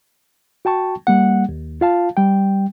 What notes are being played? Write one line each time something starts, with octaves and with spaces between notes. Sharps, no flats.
F#4 G5 A5 C#6
G3 A#3 F#5
D#2
F4 F5 A5
G3 G5